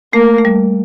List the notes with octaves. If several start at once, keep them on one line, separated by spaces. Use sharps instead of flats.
A3 A#3
A3
G3